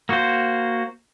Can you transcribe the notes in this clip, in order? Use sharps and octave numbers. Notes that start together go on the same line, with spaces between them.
A#3 F#4 C5